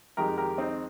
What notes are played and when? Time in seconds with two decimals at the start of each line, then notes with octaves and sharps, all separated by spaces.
0.17 F2 D#3 G#3 G4 A#4
0.37 G4 A#4
0.58 C4 D#4